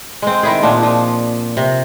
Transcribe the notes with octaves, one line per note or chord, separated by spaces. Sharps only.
G#3 C4
D#3 E4 G#4
A#2 F3 D4
F3
C3